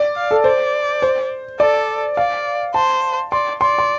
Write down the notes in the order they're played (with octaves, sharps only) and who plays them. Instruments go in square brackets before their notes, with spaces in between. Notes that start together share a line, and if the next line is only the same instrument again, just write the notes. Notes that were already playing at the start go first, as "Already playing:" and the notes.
Already playing: [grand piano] D5
[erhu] F5
[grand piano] A4
[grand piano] C5 [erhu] D5
[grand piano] C5
[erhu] A4 [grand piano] D5
[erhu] D5 [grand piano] F5
[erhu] C5 [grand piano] A5
[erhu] D5 [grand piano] C6
[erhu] D5 [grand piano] C6
[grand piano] C6